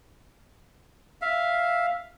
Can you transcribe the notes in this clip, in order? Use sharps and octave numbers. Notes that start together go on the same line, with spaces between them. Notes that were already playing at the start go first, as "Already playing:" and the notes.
E5 F5